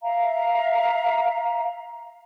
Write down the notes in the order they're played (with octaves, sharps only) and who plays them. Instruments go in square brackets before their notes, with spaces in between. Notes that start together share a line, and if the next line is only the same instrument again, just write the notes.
[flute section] E5 F5 A#5